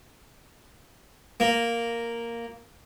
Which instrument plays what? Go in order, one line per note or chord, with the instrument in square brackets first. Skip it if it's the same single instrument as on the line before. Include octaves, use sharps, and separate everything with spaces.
[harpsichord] A#3